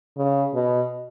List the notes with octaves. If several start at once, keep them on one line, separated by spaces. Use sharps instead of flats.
C#3
B2